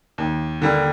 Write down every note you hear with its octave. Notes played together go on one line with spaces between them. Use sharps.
D#2
D3 G3 A#3